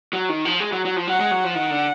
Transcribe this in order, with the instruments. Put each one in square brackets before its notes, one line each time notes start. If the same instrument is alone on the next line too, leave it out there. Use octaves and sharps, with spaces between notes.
[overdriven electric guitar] F#3
D#3
F3
G#3
F#3
F#3
F3
[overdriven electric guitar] F#3 [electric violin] F#5
[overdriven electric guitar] G#3
F#3
F3
[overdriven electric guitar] D#3 [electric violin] F#5
[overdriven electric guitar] D3